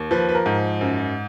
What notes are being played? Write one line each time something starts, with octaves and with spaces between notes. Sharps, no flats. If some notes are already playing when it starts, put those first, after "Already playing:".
Already playing: D#2
F3 B4
B4
A#4
G#2
F#2